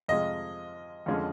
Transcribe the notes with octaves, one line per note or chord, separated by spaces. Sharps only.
F2 C3 F3 G#3 D#5
F2 D3 F3 G#3 C#4